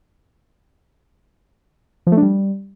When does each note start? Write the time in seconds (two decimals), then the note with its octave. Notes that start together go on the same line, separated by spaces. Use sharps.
2.07 F3
2.12 A3
2.17 D4
2.23 G3